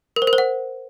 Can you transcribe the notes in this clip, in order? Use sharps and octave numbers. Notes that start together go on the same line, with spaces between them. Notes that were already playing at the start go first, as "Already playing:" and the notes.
A#4
C5
A#4
C5
F#5